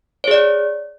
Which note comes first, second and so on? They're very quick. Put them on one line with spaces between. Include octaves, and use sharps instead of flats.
C#5 G#4 D5